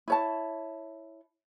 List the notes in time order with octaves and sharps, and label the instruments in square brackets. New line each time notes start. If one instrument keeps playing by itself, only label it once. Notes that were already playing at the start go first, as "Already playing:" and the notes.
[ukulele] E4 C#5 A5